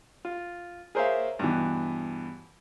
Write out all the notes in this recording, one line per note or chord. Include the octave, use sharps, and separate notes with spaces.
F4
G#4 A#4 C5 C#5 E5 F5
G2 B2 E3